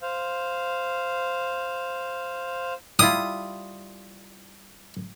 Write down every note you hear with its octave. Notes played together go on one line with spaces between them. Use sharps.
C5 F5
G3 E4 F4 D#6